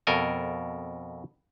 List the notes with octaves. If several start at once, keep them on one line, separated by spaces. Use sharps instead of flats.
F2 B2 A4 A#4 G5 G#5